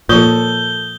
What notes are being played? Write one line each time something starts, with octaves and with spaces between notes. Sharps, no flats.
A#2 F3 A4 D#6 G6 G7